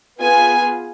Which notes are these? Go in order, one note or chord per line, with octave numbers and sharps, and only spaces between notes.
B3 F4 G#4 G#5